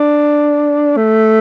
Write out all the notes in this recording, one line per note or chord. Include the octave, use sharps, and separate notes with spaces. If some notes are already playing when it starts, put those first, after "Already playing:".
Already playing: D4
A3